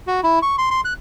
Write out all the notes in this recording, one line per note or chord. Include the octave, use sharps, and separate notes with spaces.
F#4
E4
C#6
C6
C6
F#6